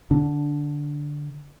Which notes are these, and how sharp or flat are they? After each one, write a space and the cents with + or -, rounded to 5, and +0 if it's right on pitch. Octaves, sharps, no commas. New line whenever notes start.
D3 +0 D4 -10